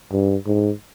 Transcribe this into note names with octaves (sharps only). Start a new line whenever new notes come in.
G2
G#2